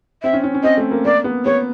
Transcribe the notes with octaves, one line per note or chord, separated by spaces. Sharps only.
C4 E5
C#4
C#4
C#4
C4 D#5
A3
A#3
A#3 D5
B3
B3 C#5